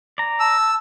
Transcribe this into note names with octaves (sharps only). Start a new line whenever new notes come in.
D5 A#5
A5 E6